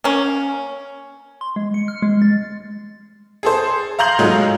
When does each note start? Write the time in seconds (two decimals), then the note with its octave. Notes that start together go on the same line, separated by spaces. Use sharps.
0.04 A#3 C#4
1.41 C6
1.56 G#3
1.74 C#7
1.88 F6
2.02 G#3
2.22 A6
3.43 G#4 A4 C5
3.99 F5 A#5 C6 G6 F#7
4.19 G#2 F#3 G#3 A3 D#4 F4